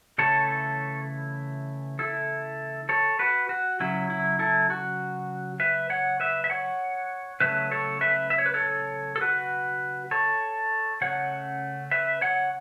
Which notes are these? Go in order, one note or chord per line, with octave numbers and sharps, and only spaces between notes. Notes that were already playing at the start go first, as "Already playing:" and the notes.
C#3 E3 A3 E4 A4 C#5
E4 A4
A4 C#5
F#4 B4
F#4
C#3 F#3 C#4 E4
E4
E4 A4
F#4
B4 E5
C#5 F#5
B4 E5
E5
C#5 F#5
C#3 F#3 A3 C#4 B4 E5
A4 C#5
B4 E5
E5
C#5
B4
A4 C#5
A4
F#4 B4
A4 C#5
C#3 A3 C#4 C#5 F#5
B4 E5
C#5 F#5